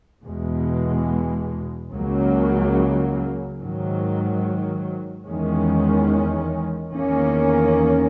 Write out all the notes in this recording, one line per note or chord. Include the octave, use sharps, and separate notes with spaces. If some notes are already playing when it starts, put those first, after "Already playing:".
E2 B2 G#3
C#2 C#3 F#3 A#3
G#2 D#3 F#3
E2 D#3 G#3 C#4
E2 D#3 A#3 C#4